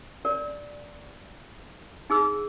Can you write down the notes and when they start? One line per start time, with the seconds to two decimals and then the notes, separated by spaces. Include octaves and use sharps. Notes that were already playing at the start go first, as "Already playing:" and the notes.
0.25 A#4 D5
2.10 D#4 G#4 E6